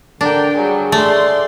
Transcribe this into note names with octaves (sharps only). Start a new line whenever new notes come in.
D3 D4 A#4 G5
F#3 G3 G#4
A3 D5 C6